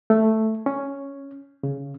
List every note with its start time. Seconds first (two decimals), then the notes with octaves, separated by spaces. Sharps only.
0.10 A3
0.66 C#4
1.63 C#3